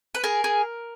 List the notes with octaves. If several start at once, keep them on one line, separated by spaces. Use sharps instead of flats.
B4
G#4 A#4
G#4